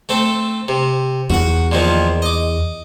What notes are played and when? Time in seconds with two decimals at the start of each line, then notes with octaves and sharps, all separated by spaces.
0.09 A3 C4 A4
0.68 C3
1.30 E2 F#4 F#5
1.72 A#2 D#3 F3
2.22 D#5 D6